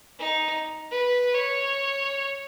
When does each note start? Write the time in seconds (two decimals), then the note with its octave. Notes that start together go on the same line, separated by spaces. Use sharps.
0.19 D#4
0.91 B4
1.34 C#5